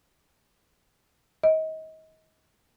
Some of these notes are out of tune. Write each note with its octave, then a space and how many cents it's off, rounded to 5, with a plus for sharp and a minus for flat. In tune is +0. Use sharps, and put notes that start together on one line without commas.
D#5 +30